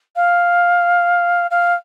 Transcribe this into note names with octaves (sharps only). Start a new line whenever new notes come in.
F5
F5